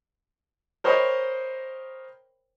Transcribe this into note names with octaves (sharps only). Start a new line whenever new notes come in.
A#4 C5 C#5 D#5 G5 B5